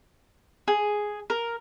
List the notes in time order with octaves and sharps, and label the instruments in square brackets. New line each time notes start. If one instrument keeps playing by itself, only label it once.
[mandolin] G#4
A#4